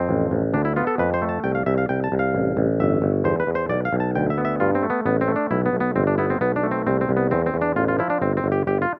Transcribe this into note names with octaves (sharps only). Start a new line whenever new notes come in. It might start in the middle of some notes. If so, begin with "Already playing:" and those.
Already playing: F2 C4
A1
A1
D2 D4
E4
B3 F4
A4
F2 B4
C5
A3
A5
C2 G5
F5
C2 E5
F5
C2 G5
A5
C2
F5
A1
A1
G1 E5
G1
E2 C5
B4
E2
C5
B1 D5
F5
B1
A5
D2 G5
E5
B3
E5
G2 F4
C4
A3
B3
A1 B3
C4
A3
D4
B1 E4
B3
B1
B3
G1 C4
D4
B3 E4
C4
B1 B3
D4
A3
C4
C2 C4
C4
C2
B3
E2 C4
C4
E2
D4
A1 F4
F4
F3 E4
D4
G1 C4
C4
G1
G4
G1 G4
F4